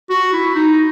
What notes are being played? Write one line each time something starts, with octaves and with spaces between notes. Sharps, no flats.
F#4
E4
D#4